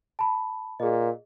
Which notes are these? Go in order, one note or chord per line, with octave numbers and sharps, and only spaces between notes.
A5 B5
A#2 G#4 D#5